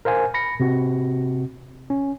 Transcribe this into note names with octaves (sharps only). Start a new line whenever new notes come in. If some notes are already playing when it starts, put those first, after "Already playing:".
A#4 C5 F5 G#5
B5 A#6 C#7
C3 C4 F#4
C#4